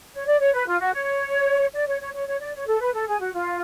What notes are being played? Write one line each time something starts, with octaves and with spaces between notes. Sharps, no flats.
C#5
D5
C#5
B4
F4
F#4
C#5
D5
C#5
C#5
C#5
C#5
D5
C#5
A4
B4
A4
G#4
F#4
F4